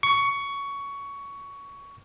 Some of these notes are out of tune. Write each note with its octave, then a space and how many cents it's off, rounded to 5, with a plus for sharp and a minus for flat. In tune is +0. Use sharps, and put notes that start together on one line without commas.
C#6 +15